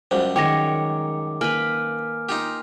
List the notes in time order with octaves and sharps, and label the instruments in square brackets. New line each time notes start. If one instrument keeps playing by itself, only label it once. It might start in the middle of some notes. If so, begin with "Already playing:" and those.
[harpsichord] C#2 F#2 G3 [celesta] C5
[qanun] D#3 G#3 C#5 [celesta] G5 A#6 [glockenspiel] D6
[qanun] A#3 B4 B5 [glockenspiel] G#5 F6
[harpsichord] D#4 F4 G4